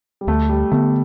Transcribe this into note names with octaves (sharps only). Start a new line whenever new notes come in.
G3
D2 A3
G3
D3 A3 B3